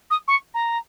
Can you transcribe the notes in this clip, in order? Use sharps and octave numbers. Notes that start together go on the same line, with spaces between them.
D#6
C#6
A#5